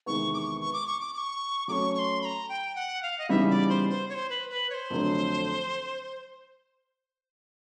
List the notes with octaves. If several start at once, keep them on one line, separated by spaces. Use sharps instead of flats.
E2 C3 D#3 G#3 B3 C#6
D6
C#6
C#6
D6
C#6
D6
D6
C#6
F#3 A3 C#4 C#6 D6
C#6
C6
B5
A#5
G5
F#5
F5
D#5
C#3 E3 G3 B3 D#4 E5
D5
C5
C5
C#5
C5
B4
B4
C#5
C5
F2 D3 F#3 A3 C4